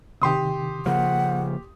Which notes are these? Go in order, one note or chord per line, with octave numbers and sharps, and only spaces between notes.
C3 D#3 G4 C6 D#6
C#3 F3 A#3 F#5